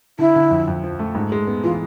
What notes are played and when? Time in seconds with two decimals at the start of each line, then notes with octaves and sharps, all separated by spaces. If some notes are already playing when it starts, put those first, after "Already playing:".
0.19 D3 E4
0.36 D3
0.51 F2
0.67 F2
0.84 F3
0.99 A3
1.15 G#2
1.32 G#3
1.47 B3
1.64 E3 F4